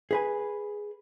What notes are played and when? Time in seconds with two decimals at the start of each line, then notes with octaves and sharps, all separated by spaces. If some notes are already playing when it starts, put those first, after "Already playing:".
0.11 G#4 B4 G#5